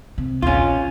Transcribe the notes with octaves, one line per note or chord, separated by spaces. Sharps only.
C3
A#1 D#2 C#4 F4